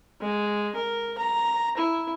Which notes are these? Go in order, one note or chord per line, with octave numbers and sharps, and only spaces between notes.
G#3
A#4
A#5
E4